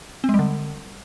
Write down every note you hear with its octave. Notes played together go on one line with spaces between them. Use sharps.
C4
G#3
G3
D3